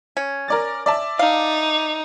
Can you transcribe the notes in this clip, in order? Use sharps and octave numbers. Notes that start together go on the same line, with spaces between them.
C#4
A#4 D5 A6
D5 E5 A5
D#4 F5